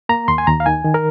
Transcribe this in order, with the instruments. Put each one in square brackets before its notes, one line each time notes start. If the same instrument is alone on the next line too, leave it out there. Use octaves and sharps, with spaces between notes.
[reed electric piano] A#3 A#5
D#2 C6
G#5
D#2 A#5
F5
D#3 G#5
D#3
A#4